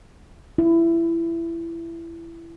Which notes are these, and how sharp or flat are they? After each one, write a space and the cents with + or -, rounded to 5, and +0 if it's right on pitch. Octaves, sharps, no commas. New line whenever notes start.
E4 +20